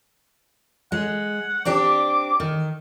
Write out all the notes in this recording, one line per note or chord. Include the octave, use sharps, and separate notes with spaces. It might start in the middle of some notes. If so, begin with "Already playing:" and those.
G#3 F#5
C4 D4 G4 D6
D#3